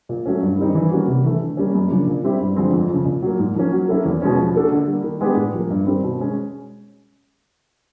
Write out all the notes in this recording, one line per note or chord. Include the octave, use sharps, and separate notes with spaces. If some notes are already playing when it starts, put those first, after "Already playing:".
A#2
F#3 A3 C#4
G2
D#3 G3 C4 D#4
E3
G3 A#3 C#4 F#4
C3
E3 A3
D3
G3 A#3 C#4
F#2
C#3 F3 A#3 D4
A#2
G3 C4 E4 G4
G2
D3 F3 G#3 C4
F2
C#3 F3
A#2
F#3 A#3
G#2
F3 A#3 C#4
F#3
A#3 C#4 E4 A4
E2
B2 G#3 C#4
F3
A#3 D4 F#4 A4
D3
G3 A#3
D#3
G#3 B3 D4 G4
A2
F3 A#3
G2
D#3 G3 C4
B2
G#3 C#4